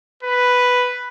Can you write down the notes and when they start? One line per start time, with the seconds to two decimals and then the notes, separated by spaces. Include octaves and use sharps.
0.23 B4